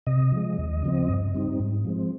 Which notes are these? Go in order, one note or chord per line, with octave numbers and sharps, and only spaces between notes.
C3 D#5
F3 G#3
D#2
C#3 F3 C4
G2
G3 C4 D#4
G#2
F3 G#3 C4